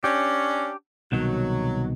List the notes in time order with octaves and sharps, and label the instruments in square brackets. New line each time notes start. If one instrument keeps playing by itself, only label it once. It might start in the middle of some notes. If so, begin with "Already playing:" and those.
[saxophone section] C#4 D4 [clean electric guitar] G4
[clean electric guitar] C2 B2 D#3 [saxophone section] F#3